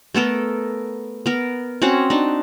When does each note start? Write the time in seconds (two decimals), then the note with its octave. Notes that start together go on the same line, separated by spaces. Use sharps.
0.14 A3 B3 A4 A#4
1.26 B3 A#4
1.82 C4 C#4 F#4 F#5
2.10 D4 D#4